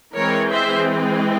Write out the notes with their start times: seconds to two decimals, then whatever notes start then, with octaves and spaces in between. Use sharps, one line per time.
0.15 E3 G#3 C4 A#4 C#5
0.52 C5 E5